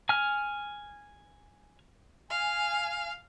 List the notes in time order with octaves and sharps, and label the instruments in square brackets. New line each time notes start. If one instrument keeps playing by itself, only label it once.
[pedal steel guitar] G#5 F6
[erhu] F5 [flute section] G#5